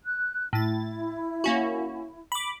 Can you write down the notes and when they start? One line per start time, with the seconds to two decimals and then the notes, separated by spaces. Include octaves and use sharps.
0.05 F#6
0.53 A2 E4 A6
1.44 A#3 C#4 F#4
2.32 B5 D6